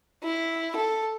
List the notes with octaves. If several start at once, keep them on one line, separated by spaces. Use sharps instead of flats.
E4
A4